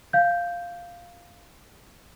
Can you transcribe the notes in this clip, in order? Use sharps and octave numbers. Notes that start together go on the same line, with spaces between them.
F5 G6